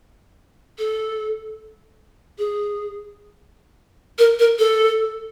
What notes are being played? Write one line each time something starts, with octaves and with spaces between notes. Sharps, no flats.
A4
G#4
A#4
A#4
A4